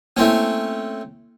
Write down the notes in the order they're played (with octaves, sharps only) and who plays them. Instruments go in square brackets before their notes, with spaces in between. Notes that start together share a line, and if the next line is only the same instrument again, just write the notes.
[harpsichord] A3 C4 C#4 [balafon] A#3 E4